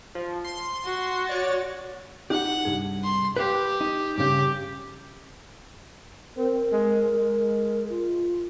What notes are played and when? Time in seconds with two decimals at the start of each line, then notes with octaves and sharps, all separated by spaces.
0.15 F3
0.44 C6
0.85 F#4
1.27 C#5 D5 A6
2.30 D#4 G4 F#5
2.65 C2 G2 G#4
3.04 C6
3.36 G4 B4 F5 G5
3.81 D#4
4.18 G2 C#3 G4
6.37 C4 A#4
6.72 G#3
7.14 G#3
7.90 F4